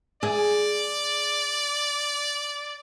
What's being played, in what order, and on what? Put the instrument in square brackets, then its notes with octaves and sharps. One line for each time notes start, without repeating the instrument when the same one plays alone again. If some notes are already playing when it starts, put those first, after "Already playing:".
[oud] G#4 [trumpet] D5